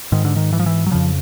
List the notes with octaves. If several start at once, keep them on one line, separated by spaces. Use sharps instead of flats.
G#2 D#3
D3
D#3
E3
F3
E3
F#3
F2 C#3 F3